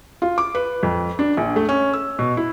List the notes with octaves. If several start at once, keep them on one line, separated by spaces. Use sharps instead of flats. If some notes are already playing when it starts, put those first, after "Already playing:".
F4
D6
B4
F2
D4
A#1
A3
C#4
E6
B2
E4